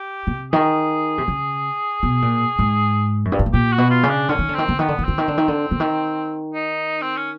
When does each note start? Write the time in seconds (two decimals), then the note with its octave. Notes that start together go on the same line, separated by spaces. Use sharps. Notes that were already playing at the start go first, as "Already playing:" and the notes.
Already playing: G4
0.27 C3
0.52 D#3 G#4
1.18 C3
1.28 C#3
2.03 B2
2.22 A#2
2.59 G#2
3.25 F#2
3.32 G2
3.39 G#2
3.46 A2
3.53 A#2 G4
3.73 F#4
3.78 B2
3.90 F4
4.03 C#3
4.10 D4
4.29 D3 C#4
4.39 D#3
4.49 D3
4.54 D#3 C4
4.68 D3
4.79 D#3 B3
4.88 D3
4.99 D#3
5.05 D3 C4
5.18 D#3
5.28 D3
5.38 D#3
5.48 D3
5.71 D3
5.80 D#3
6.54 D#4
7.02 C4
7.17 C#4